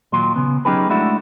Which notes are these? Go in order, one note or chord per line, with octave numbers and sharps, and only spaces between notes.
D#2 A#2 F#3 C6
C#3 B3
F#3 C#4 D#4 G4 G#4 B4
G#3 A3 D4 E4 F#4